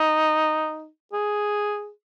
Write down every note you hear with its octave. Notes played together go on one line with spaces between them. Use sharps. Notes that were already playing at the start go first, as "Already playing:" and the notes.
Already playing: D#4
G#4